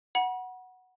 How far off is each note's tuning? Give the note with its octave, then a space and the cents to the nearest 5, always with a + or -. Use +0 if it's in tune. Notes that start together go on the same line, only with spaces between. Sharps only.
F#5 +0 B5 -45